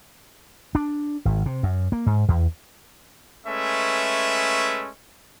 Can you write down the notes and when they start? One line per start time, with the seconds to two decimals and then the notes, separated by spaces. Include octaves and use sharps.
0.75 D4
1.25 G#1
1.46 C3
1.63 F#2
1.92 A#3
2.06 G#2
2.28 E2
3.47 G#3 A3 C#4 B4 E5